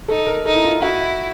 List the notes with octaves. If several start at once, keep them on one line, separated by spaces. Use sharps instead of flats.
D#4 A4
A#4
D#4 A4
E4
F4
E4 F#4